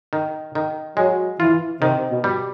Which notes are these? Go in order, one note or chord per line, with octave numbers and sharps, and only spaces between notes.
D#3
D#3
F#3 G#3
E3 F4
C3 D#3
B2
G3